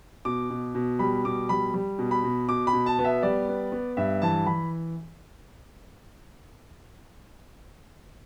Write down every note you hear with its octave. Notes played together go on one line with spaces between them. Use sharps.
B2 D6
B2
B2
G3 B5
B2 D6
G3 B5
G3
B2
B5
B2
B2 D6
B5
B2
A5
B3
E5
G3 D5
B3
B3
G2 E5
E3 A5
E3 B5